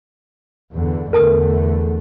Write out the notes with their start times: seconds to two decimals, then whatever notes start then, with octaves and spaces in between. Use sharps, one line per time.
0.73 E2 G2 D3
1.13 E2 D3 A3 A#4 A5 D#6